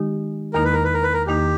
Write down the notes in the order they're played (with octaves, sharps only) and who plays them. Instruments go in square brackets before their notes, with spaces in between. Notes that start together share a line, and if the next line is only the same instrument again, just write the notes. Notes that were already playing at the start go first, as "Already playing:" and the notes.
Already playing: [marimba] D#3 G#3 D#4 G4
[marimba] E2 D#3 A#3 D#4 [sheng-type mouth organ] A#4
[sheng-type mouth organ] B4
A#4
B4
A#4
B4
A#4
[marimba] E2 D#3 A#3 D#4 [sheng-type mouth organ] G4